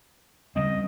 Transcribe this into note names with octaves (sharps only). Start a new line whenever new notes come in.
C#3 G3 C4 D#5